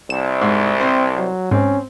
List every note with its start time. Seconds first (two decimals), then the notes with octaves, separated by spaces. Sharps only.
0.10 C2 E7
0.41 G#2
0.81 C4 C5
1.17 F#3
1.51 G#2 C4 C#4